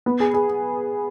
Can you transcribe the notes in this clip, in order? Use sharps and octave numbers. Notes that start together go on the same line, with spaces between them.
B3
G#4
G#4